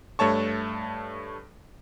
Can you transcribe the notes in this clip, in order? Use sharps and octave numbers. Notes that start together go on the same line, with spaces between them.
G2 A3 C#5 A5 C#6